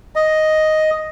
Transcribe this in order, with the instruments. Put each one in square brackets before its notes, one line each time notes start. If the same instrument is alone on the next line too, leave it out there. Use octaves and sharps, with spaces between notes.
[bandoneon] D#5